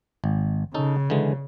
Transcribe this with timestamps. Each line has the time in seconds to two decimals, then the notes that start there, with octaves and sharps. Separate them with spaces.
0.24 G#1
0.74 C#3 C#4 D#4 A4
1.10 D3 E3 G#3